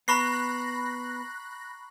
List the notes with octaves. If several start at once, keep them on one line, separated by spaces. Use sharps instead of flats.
B3 A#5 B5 C#6 F#6 A#6 C7